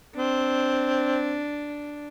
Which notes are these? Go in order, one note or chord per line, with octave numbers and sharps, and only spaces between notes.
C4 D4